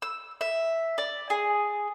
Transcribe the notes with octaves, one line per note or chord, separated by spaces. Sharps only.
E6
E5
D5
G#4